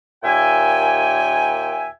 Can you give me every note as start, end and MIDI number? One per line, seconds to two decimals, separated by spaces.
0.24 1.88 39
0.24 1.88 46
0.24 1.88 76
0.24 1.88 79
0.24 1.88 80